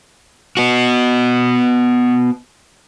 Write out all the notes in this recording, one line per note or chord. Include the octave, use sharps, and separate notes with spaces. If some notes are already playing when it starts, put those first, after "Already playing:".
B3 F#4